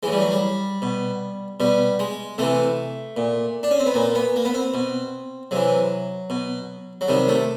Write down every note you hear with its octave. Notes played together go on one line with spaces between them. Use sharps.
A2 E3 G#3
G3
F#3
G3
B2
B2 G3
G#3
C3 E3 A3
A#2
D4
C#4
C4
B3
A#2 A#3
B3
A#3
B3
C4
B2
C3 E3 F#3
B2
F#3
C3 D#3 G3
A3